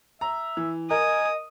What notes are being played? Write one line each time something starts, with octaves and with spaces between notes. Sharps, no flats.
E5 A#5
E3
A#4 D#5 G#5 D#6